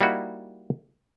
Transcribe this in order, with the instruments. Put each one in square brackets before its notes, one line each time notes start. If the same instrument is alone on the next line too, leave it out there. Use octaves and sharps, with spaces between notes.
[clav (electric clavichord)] G3 A#3 D#4 E4 F#4